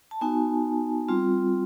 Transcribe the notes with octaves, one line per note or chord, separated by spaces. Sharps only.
A5
B3 D#4 F#4 G#5
G3 C4 F4